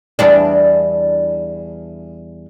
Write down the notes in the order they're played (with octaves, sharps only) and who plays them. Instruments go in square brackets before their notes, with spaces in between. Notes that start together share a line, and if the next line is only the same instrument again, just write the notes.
[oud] E2 G3 D4